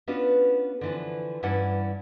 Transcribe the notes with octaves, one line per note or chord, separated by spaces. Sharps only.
B3 C#4 D4 F4 F#4 B4
D3 E3 F3
G2 E3 C#4 E4 D5 F#5